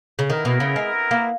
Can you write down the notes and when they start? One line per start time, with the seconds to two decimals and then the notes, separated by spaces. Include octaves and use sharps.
0.19 C#3
0.30 D#3 B3 E4 A#4
0.45 B2
0.60 C#3
0.76 G#3
1.11 A#3